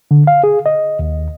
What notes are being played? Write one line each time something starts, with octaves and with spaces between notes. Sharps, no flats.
D3
F5
G#4
D#5
D#2